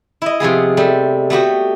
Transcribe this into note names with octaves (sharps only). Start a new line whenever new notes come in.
E4 D#5
C3 F3 B3 G#4
G3 A3
A3 B3 F#4 G4